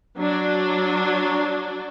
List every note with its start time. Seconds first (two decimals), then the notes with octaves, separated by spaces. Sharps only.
0.18 F#3 D4